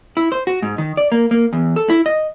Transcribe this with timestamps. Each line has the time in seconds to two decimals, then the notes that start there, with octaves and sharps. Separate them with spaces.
0.17 E4
0.32 C5
0.47 F#4
0.62 G#2
0.78 D#3
0.97 D5
1.12 A#3
1.31 A#3
1.53 E2
1.76 A4
1.90 E4
2.06 D#5